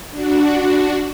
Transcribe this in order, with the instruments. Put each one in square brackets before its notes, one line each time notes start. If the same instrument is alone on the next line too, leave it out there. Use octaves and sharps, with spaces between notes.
[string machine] D4 F#4